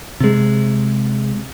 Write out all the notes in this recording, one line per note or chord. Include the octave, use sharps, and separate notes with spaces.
C3 G#3